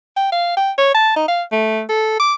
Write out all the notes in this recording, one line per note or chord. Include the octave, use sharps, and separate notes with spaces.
G5
F5
G5
C#5
A5
D#4
F5
A3
A4
D6